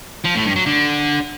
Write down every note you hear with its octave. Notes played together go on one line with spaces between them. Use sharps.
F3
A2
G2
F#3
D3